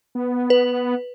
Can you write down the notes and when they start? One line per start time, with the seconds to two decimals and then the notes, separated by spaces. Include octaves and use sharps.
0.15 B3
0.50 B4